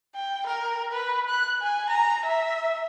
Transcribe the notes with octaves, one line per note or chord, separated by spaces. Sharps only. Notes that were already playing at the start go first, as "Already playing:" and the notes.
G5
A#4
B4
F#6
G#5
A#5
E5